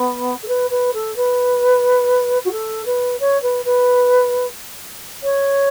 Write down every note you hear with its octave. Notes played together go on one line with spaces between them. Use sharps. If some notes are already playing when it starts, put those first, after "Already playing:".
Already playing: B3
A4
B4
B4
A4
B4
F#4
A4
B4
C#5
B4
B4
C#5